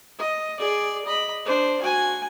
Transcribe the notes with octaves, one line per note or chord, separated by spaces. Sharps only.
D#5
G#4 D5
D#5 B5
D4 C5
F#4 G#5